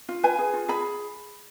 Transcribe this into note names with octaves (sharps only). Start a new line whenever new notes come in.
F4
B4 G#5
G#4
F4
G#4 B5